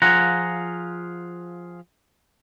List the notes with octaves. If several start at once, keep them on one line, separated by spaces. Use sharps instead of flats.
F3 F4 G#4 F#5 A#5